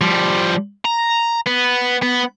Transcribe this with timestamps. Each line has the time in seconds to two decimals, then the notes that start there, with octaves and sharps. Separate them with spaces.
0.01 F3 G3
0.85 A#5
1.47 B3
2.02 B3